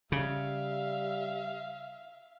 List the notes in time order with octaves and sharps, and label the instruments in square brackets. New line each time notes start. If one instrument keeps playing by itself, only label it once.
[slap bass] C#3 [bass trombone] G3 [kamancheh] E5 F5